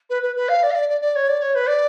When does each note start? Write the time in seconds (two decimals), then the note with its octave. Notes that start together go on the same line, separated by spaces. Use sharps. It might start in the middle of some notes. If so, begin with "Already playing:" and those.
0.10 B4
0.22 B4
0.35 B4
0.48 F5
0.63 D5
0.70 F5
0.75 D5
0.89 D5
1.01 D5
1.15 C#5
1.28 D5
1.42 C#5
1.55 B4
1.68 D5